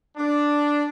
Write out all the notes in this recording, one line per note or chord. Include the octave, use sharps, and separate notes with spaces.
D4